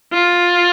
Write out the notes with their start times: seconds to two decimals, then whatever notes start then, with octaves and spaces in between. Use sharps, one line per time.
0.13 F4